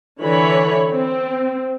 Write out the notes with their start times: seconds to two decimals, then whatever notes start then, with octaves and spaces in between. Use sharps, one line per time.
0.23 D3 E3 C#5 B5
0.91 C4